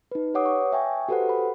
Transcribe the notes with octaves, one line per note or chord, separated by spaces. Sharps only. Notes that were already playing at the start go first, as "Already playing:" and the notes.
D#4 B4
G4 B4 C#5 F#5 D6 D#6
C#6
E5 G5 G#5 C#6
F#4 G4 A4 B4 C5 F#5
B5